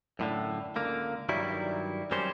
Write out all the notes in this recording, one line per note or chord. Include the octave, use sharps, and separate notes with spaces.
F#2 A2 D3
C#2 D3 A#3
G2 D#3 F#3 G3 E4
F#2 G3 C4 C#4 C5